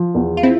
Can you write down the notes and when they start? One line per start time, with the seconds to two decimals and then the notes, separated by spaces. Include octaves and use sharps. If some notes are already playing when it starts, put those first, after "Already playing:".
Already playing: F3
0.15 E2
0.37 F4
0.43 C4 E4